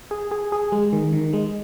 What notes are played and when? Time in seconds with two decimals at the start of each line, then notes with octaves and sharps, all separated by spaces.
0.11 G#4
0.31 G#4
0.52 G#4
0.72 G#3
0.93 D#3
1.12 D#3
1.33 G#3